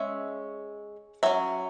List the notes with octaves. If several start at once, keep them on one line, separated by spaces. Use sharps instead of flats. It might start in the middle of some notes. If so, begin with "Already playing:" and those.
Already playing: G#3 C#4 E5
F#3 C#4 E5